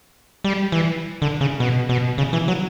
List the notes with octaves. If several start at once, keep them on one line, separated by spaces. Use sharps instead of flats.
G3
E3
D3
C#3
B2
B2
C#3
E3
F#3